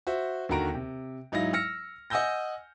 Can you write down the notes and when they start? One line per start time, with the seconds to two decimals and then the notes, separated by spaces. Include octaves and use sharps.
0.07 F#4 C5 E5
0.49 D#2 D3 D#3 F#4 A#5 D7
0.74 C3
1.32 G#2 F#3 D#4 E4 F5 A#6
1.53 E6 F6 A#6 C#7
2.10 D#5 F#5 G#5 E6 G6 A#6